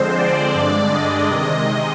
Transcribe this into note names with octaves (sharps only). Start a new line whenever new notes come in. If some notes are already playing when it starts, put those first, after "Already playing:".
Already playing: D3 F3 G#3 C4 C5
D5
G2 D3 G#3 D4
D#5
C3 D#3 G#3